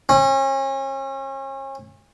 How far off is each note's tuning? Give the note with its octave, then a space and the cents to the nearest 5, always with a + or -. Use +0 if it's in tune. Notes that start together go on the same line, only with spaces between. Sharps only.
C#4 -35